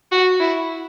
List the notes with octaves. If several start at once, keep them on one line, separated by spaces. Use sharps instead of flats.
F#4
E4